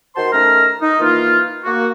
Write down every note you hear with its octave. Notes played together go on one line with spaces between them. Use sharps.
D#3 F#4 C5 A5 C6
D#3 A3 C#4 A5 A#5 F6
D#4
D#3 E3 A#3 D#4 F4
A#3 F#4